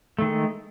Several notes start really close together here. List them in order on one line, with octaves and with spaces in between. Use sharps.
A3 D#3 G#3